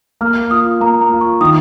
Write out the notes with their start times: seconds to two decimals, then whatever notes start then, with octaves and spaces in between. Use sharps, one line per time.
0.21 A#3 F6
0.51 F4 D#6
0.80 A#3 A#5
1.01 A#5
1.11 F4
1.21 C#6
1.41 D#3 D#6